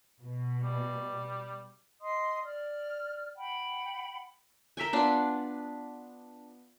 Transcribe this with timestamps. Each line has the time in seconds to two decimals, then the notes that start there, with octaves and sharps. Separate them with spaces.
0.22 B2
0.63 G3
2.00 D#5 C6 D#6
2.44 D5 F6
3.37 F#5 G5 B5
4.77 A#4 E5 G5 G#5
4.93 B3 D4 F4